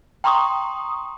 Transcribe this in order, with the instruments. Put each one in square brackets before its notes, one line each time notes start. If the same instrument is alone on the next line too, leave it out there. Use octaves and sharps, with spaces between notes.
[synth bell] G5 A#5 C6 C#6 D#6